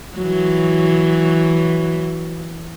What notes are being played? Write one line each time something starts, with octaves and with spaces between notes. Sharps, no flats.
E3 F#3